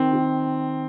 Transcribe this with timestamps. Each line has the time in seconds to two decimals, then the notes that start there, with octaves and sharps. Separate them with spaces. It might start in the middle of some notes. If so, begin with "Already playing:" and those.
Already playing: D#3 C4
0.13 D#3